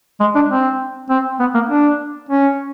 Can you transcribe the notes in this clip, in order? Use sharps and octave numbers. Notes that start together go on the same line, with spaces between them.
G#3
D4
C4
C4
B3
A#3
D4
C#4